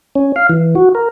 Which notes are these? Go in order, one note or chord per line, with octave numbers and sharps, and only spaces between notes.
C#4
F5
E3
F#4
A#4